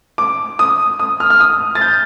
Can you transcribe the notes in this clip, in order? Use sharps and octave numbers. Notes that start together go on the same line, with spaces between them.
D6
D#6
D#6
F6
F6
D#6
A6
G6